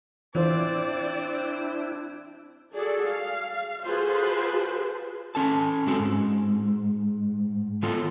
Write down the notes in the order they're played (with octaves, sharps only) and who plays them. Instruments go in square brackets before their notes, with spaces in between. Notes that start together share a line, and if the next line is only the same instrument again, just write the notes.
[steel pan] E3 F4 C5 [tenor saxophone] C4 [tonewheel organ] D4 E4 [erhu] D5
[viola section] F#4 G#4 A4 D5
F5
F4 F#4 G#4 A4 B4 C5
[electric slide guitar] C#4 A4 A5
G#3 C4 F#4 A4
G#2
D#3 B3 F4 A4